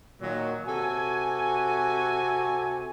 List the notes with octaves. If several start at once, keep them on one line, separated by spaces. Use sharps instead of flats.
A#2 D#3 F#3
C3 F#4 A4 G#5